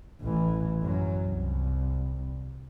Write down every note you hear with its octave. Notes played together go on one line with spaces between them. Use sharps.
A1 E3
F#2 F#3
C2